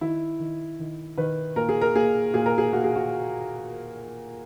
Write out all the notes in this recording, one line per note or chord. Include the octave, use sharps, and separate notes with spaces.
D#3 E4
D#3
D#3
D#3 B4
A#2 A#4
G#4
A#4
A#3 G#4
A#2 G#4
A#4
G#4
A#3 F#4
G#4
F#4